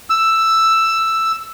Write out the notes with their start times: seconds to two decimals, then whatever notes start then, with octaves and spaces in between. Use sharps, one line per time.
0.10 E6